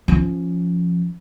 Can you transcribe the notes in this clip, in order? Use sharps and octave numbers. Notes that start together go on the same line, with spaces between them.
F3 C#4